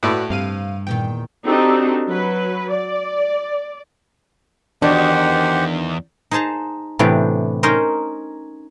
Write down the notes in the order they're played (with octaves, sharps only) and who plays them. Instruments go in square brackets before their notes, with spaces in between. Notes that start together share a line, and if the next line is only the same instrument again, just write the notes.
[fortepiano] A2 [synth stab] F#4 B4 D5
[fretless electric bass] G2 [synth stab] C3 F5 D#7
[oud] E2 A#2 D#3 [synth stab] G5
[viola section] C4 D4 D#4 F#4 G4 A4
F#3 B4
D5
[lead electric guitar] E2 [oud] D#3 F#4 [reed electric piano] D4 [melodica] G4 C5 F#5
[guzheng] D#4 G#4 C5 A5 A#5
A2 C3 E3 B3 D4 G4
C#4 D#4 A#4 C5 D#5